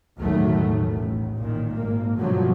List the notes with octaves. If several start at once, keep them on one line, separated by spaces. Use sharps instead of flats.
B1 E2 A2 D#3 F#3 A3
A2
A1
A#2 D#3
G#1 A#3
G2 B2 D3 F3 F#3 A3